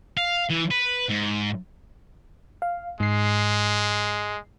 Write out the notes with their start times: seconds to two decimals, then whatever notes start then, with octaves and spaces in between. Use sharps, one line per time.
0.17 F5
0.50 E3
0.71 B4
1.09 G#2
2.62 F5
3.00 G#2 G#3 C7